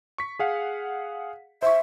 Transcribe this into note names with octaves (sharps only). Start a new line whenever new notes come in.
C#6 B6
G#4 F5 F#5
C5 E5 C#6